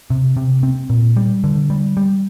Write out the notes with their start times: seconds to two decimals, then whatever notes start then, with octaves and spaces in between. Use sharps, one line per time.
0.10 C3
0.37 C3
0.63 C4
0.90 A#2
1.16 G3
1.44 D3
1.70 G3
1.97 G3